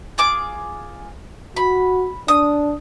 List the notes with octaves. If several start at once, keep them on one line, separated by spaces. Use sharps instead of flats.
F4 G#4 D6
F#4 B5
D4 D#6